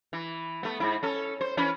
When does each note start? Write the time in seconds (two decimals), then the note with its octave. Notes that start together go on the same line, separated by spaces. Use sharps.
0.13 E3
0.63 A3 B3
0.80 G#2 E4
1.03 C#4 A4
1.41 C5
1.57 E3 C#4 B4